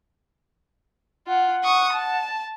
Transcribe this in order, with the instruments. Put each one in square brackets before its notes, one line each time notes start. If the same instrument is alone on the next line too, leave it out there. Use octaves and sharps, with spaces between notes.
[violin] F4 [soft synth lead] F#5
[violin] C#6 D#6
A5